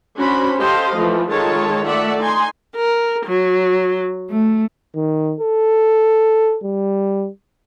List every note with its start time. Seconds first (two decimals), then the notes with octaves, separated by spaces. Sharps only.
0.17 C#4 D4 F#4 C5 B5
0.58 G4 A4 C5 D#5 F5
0.96 E3 F3 A3
1.30 D#3 G#3 F4 A4 C#5 A5
1.86 A3 D5 E5 F#5
2.20 D#4 G#5 C6
2.75 A#4
3.25 F#3
4.30 A3
4.95 D#3
5.40 A4
6.64 G3